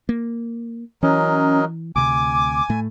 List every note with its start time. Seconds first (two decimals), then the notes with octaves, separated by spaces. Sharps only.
0.09 A#3
1.03 E3 F#3 C#4 A#4 D#5
1.96 D2 C3 G#5 D6
2.69 A2 A3